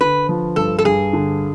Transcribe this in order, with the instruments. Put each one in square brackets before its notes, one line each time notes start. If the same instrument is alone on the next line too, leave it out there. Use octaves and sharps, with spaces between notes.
[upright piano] D3 [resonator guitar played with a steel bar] B4
[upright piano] F3
[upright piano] G2 [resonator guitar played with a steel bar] A4
[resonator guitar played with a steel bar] A4
[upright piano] G2 [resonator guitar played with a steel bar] G#4
[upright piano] D3